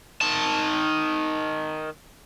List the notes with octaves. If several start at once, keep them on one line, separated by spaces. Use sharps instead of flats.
D#3 A5